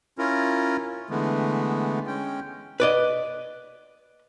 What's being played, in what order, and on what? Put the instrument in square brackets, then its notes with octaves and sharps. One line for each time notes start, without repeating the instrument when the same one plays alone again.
[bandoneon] C#4 E4 F4 A#4
D3 E3 G#3 A3 B3
G#3 C#4 G5
[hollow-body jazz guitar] B4 D5 D#5